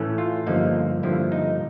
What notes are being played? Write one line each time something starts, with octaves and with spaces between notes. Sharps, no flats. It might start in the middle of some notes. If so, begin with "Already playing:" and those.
Already playing: A2 E3 A3 C#4
F4
G1 G2 D3 F3 A#3 D#4
G1 G2 D3 F3 A#3 E4
D#4